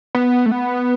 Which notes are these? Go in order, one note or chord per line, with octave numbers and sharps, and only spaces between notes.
B3
A3
B3